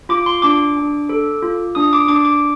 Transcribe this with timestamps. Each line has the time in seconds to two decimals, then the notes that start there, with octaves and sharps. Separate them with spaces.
0.09 F4 D6
0.26 C6
0.42 D4 D6
0.77 D4
1.09 A4
1.42 F4
1.75 D4 D#6
1.93 D6
2.08 D4 D6
2.25 D6